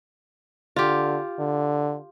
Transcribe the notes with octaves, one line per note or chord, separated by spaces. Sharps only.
D3 F4 G4
D3